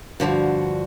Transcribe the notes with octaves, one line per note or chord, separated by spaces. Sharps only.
G2 D3 F3 F#4